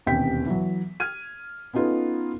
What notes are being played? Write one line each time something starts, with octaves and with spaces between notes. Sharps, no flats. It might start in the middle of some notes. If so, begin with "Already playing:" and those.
E1 D#2 C3 C#4 G5 B6
E3 F#3
F6 G#6 D#7
B3 C#4 D#4 F4 A4 B4